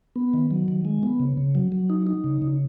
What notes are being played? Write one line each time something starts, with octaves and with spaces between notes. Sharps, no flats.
B3
D#3
F#3
D#3
G#3
B3
C#3
C#3
F#3
F#3
D#4
D#4
C#3
C#3